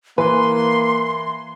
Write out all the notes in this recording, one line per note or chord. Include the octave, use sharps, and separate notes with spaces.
E3 A#3 B4 C6